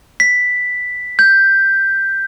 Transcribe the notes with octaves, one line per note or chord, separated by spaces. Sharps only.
B6
G6